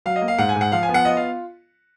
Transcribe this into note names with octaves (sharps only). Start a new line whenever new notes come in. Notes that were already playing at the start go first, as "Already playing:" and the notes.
F#3 F5
D#5
A#3
F5
G#2 F#5
G#5
G#2
F#5
F3 F5
G#5
B3
F#5
F4 D#5
F5